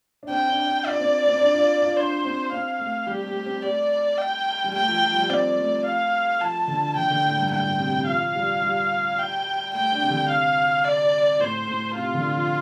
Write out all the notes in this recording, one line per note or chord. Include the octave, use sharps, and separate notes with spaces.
D4
C4 G5
D4
D4
F4 D5
C4
C4
D4
F4
F4
D4 C5
C4
C4 F5
A3
G3 G4
A3
C4
A3 D5
G5
G3
A3 G5
F3
F3
G3
C4 D5
A3
F5
F3 A5
D3
D3 G5
D3
A2
G2
G2 G5
A2
C3
C3
F3 F5
G3
G3
G5
A3 G5
D4
C3
D3
C3 F5
D5
A2 C5
A2
C3 F4
D3
F3